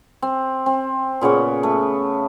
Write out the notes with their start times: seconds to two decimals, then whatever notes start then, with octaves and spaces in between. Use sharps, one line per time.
0.22 C4
0.66 C4
1.21 A#2 C#3 B3 C#5
1.63 A3